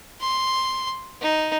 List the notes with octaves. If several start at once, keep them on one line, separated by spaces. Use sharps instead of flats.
C6
D#4